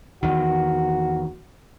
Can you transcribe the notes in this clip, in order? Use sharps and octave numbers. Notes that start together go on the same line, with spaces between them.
E2 D#3 F#4